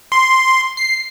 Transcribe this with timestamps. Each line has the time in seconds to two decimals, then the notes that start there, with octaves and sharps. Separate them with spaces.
0.12 C6
0.77 C7